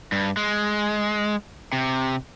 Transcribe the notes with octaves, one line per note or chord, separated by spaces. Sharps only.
G2
G#3
C3